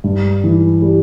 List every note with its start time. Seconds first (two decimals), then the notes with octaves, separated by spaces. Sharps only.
0.04 G2
0.44 E3
0.82 G3